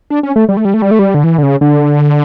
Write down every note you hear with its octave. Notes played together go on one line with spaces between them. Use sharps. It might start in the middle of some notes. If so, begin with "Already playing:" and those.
D4
C#4
A3
G3
A3
G3
A3
G3
A3
G3
D3
E3
D3
C#3
D3